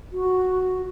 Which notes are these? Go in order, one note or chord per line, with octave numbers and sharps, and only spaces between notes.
F#4